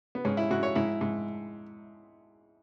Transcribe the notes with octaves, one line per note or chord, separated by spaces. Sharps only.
B3
G#2 C#4
E4
G#2 F#4
C#5
G#2 E4
G#2